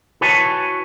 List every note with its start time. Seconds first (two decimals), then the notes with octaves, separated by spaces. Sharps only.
0.21 E4 F#4 B4 C#5 G#5 A5